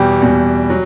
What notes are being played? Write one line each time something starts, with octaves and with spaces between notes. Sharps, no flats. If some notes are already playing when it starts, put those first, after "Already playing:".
Already playing: E2 B2 G3 G4
E2 B2 G3
F#3